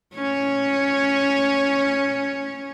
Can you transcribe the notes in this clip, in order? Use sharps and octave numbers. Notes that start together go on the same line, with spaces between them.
C#4 C#5